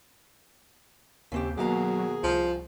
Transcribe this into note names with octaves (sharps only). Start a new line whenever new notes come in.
D#2 C#3 C4 G4
D#2 B2 F#3 G#4 F5 A#5
C2 F3